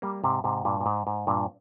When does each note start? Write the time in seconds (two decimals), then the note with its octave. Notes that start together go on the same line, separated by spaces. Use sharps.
0.02 G3 A#3
0.24 G#2 C3
0.44 G#2 C3
0.65 G2 A#2
0.81 A#2
0.86 G#2
1.07 G#2
1.27 G2 A#2